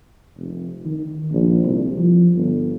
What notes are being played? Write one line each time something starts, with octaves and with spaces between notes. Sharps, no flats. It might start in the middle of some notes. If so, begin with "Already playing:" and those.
F1
D#3
A#1
C2
F3
G1